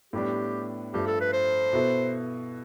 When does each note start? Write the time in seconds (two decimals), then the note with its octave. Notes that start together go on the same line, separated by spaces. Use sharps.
0.13 A2 G3 B3 D4 G4
0.94 G2 F3 A3 G4
1.07 A4
1.20 B4
1.33 C5
1.73 B2 B3 E4 A4